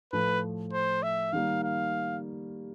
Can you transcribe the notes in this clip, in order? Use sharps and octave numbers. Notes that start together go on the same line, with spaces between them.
A2 F3 A3 B4
C5
E5
D#3 G3 A#3 F5
F5